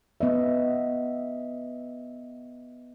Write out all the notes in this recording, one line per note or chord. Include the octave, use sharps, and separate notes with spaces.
B3 D#5 E5